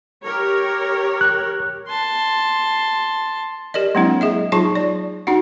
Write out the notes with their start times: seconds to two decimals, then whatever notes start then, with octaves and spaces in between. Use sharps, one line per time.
0.24 G4 A#4 C#5
1.21 F#6
1.88 A5 C6
3.74 G4 A#4 D5 D#5
3.95 F#3 G#3 A#3 C4 D4 E4
4.21 G#4 D#5 E5
4.52 F#3 D#4 F4 G#4 A5 C#6
4.75 D5
5.27 D4 D#4 F#4 F#5